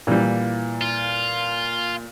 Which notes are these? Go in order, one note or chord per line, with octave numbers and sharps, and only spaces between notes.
A#2 E3 G3
F4